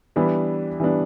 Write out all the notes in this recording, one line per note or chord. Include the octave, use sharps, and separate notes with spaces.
E3 G3 B3 D4
E3 G3 B3 D4